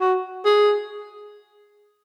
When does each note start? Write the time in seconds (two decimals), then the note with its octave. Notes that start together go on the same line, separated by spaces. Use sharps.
0.01 F#4
0.45 G#4